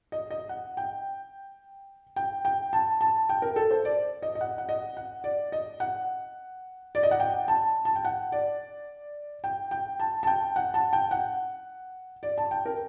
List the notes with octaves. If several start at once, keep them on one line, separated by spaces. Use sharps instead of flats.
D#5
D#5
F#5
G5
G5
G5
A5
A5
G5
A#4
A4
C5
D5
D#5
D#5
F#5
F#5
D#5
F#5
D5
D#5
F#5
D5
D#5
F#5
G5
A5
A5
G5
F#5
D5
G5
G5
A5
A5
G5
F#5
A5
G5
F#5
D5
A5
G5
A#4